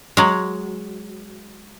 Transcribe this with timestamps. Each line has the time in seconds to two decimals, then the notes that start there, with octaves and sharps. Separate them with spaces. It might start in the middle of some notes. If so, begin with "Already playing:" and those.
0.17 F#3 G#3